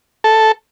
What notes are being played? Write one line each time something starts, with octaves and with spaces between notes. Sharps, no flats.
A4